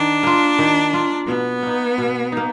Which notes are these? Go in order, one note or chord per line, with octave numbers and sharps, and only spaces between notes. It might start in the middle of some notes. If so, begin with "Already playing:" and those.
Already playing: D#3 D4
A#3 F4
D#3
A#3 F4
B2 B3
A#3 D#4
B2
A#3 D#4